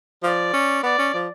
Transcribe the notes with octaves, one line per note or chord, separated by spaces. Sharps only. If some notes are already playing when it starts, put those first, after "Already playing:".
F3 D5
C#4
B3 D5
C#4
F3